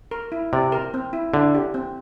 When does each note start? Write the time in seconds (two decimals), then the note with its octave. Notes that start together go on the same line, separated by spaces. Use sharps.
0.11 A#4
0.32 E4
0.53 C3 D5
0.72 A#4
0.94 C4
1.13 E4
1.33 D3 E4
1.55 G4
1.74 C4